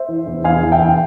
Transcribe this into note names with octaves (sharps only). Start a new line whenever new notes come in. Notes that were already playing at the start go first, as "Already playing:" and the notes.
Already playing: C5 E5
E3
E2
E2 F5 G#5
E2
E5 G5
E2